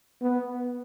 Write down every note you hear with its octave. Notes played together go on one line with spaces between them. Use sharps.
B3